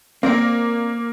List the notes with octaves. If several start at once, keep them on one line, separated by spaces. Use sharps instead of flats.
A#3 C4 A#4 D5